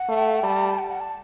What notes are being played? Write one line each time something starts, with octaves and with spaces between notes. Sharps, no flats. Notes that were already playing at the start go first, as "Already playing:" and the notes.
Already playing: F#5
A3
G3 A5
F#5
F#5
A5